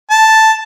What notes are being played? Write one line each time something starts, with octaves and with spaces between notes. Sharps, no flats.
A5